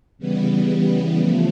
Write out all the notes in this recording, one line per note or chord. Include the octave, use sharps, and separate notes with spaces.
C#3 E3 G3 B3
C#3 F3 A3